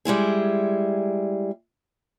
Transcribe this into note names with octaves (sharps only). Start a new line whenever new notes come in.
G3 G#3 E4 G#4